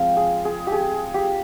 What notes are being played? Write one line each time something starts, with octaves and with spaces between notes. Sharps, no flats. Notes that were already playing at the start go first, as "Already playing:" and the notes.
Already playing: F3 G#3 C4 F4 F5
G#4
G#4
G4
G#4
G4